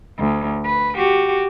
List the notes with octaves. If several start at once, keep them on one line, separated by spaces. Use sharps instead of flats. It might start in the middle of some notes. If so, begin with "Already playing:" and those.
D2
B4
F#4 G4